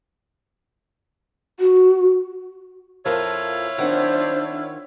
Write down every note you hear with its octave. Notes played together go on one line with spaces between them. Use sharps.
F#4
F2 F3 E4 F4 A#4 C#5
D#3 D4 C5 F#5